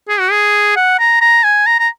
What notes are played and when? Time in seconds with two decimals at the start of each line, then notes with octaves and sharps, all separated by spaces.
0.09 G#4
0.20 F#4
0.31 G#4
0.76 F#5
0.99 A#5
1.21 A#5
1.44 G#5
1.66 A#5
1.79 A#5